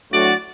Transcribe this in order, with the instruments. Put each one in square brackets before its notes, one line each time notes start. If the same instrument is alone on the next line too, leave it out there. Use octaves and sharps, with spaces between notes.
[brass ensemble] A2 F#3 A3 D4 F#4 [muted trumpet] D5